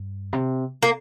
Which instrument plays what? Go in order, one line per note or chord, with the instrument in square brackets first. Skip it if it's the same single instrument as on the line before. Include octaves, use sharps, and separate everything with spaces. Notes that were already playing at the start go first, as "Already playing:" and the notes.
Already playing: [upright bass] G2
C3
[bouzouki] A#3